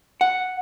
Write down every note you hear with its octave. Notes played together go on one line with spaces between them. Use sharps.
F#5